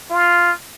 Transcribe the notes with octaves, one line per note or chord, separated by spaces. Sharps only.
F4